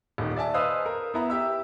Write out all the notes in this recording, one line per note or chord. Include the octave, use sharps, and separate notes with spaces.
D#1 D#3
D5 E5 G#5 A5
B4 C5 D#5 F5 D#6 E6
A#4
B3 E4 A#5
G4 E5 E6